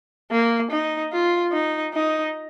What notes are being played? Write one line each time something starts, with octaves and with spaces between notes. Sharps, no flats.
A#3
D#4
F4
D#4
D#4